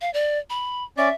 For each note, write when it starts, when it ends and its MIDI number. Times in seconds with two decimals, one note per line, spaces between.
0.01 0.12 77
0.14 0.39 74
0.50 0.84 83
0.98 1.09 61
0.98 1.09 74
0.98 1.15 76